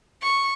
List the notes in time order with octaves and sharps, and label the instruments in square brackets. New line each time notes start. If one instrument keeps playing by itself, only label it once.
[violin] C#6